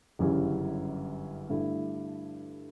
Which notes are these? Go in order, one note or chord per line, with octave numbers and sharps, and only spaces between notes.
G1 F#2 C#3 E3 G3
G2 D3 A3 E4